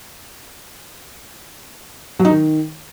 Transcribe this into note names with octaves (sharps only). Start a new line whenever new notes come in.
F#3
D#4
D#3